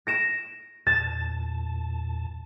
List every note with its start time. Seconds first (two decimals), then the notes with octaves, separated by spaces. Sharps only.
0.07 A#6 D7 E7
0.87 E2 A#2 A5 A6